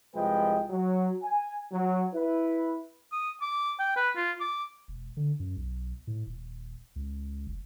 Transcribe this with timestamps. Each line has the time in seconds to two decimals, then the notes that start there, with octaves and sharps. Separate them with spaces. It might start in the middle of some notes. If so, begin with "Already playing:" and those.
0.15 C2 F3 G#3 B4 D#5 G5
0.70 F#3
1.23 G#5
1.72 F#3
2.13 E4 B4
3.12 D#6
3.42 D6
3.79 G5
3.96 B4
4.16 F4
4.40 D6
4.88 E1
5.17 D3
5.40 F#2
5.57 B1
6.07 A2
6.27 D#1
6.96 C#2
7.47 F1